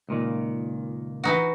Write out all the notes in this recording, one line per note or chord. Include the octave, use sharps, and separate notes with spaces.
C#2 A#2 D#3
E3 D#4 F#4